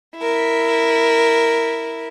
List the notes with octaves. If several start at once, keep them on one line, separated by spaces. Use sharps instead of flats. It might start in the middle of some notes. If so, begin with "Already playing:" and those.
E4 A#4